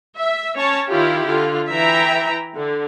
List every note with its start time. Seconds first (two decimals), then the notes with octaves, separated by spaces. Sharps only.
0.18 E5
0.57 C#4 C#5 A5
0.87 D#3 E4 F4 G4
1.27 D3 F4
1.70 E3 E5 G5 A#5
2.55 D3